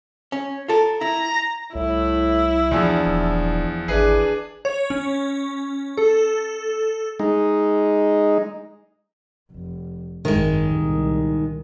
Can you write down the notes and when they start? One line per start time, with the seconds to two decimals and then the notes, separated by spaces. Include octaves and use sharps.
0.32 C#4
0.68 F4 A4 A#4
1.01 E4 A#5
1.75 C2 A2 E4
2.71 E2 F3 D4
3.06 D#1
3.88 G#1 E3 D4 G#4 B4
4.65 C#5
4.90 C#4
5.97 A4
7.19 G#3 D#4
9.52 F1
10.25 G#1 F#2 D#3 G#3
10.76 C2 A#2